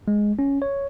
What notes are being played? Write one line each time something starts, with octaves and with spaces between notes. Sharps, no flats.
G#3
C#4
C#5